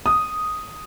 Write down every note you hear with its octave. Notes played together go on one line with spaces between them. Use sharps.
D#6